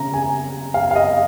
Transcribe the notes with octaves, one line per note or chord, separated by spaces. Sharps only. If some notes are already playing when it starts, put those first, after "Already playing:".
Already playing: C#3 A#5
G#5
F5
F5
D#5